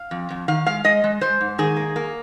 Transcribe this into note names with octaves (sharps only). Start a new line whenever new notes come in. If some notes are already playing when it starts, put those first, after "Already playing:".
Already playing: F5
F2
F2
D#3 F5
G#3 F5
G#3 D#5
G#3
G#3 C5
G#2
D#3 G#4
A#3
A#3